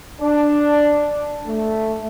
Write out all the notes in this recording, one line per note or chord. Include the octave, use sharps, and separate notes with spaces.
D4
A3